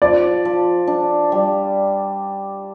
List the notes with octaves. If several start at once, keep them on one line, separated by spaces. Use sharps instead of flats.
F3 D5
F3
D4
G3